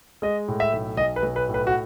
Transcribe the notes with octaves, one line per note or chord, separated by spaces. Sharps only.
G#3 D#5
A2
E5
B1
B1 D#5
B4
B1
B4
A2
B4
F#4